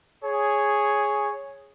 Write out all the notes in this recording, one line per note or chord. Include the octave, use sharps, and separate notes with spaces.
G#4 C#5